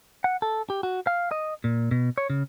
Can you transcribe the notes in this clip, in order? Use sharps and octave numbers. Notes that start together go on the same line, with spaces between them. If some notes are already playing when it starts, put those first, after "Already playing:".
F#5
A4
G4
F#4
F5
D#5
A#2
B2
C#5
C#3